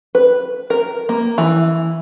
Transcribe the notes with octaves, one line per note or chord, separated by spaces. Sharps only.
B4
A#4
A#3
E3